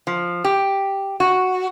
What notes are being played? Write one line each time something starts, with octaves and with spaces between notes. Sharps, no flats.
F3
G4
F#4